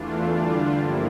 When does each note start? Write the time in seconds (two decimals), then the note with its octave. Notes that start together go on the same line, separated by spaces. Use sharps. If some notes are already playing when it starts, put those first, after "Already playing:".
Already playing: E2 E3 A3 D4 F4
0.30 D3 G3 D4 F4
0.77 G2 F3 A#3 E4